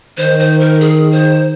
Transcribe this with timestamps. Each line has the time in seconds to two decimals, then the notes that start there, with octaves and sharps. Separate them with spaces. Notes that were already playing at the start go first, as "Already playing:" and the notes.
0.17 D#3 C5
0.39 C5
0.59 A#4
0.80 G#4
1.12 C5